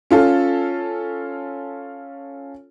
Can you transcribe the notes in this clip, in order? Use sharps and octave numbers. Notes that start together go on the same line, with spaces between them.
C#4 F4 A4